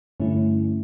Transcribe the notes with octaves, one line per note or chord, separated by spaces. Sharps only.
G2 D3 A3 C#4 E4